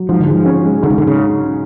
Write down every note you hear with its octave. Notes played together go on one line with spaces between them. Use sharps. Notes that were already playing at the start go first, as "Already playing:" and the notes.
Already playing: F#3
G#2 F3
D3
F3 G#3
C#4
G#3
G#2 D3
C#3
D3
C#3